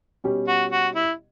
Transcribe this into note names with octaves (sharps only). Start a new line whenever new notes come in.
B2 G3 C#4 G4
F#4
F#4
E4